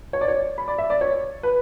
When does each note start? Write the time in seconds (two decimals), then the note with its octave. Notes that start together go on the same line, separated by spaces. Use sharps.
0.13 C#5
0.21 D5
0.28 C#5
0.58 B5
0.68 D5
0.78 E5
0.90 D5
1.01 C#5
1.43 B4